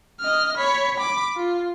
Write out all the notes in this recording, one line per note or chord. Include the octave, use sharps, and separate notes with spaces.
D#5 F6
C#5 B5
B5 D6
F4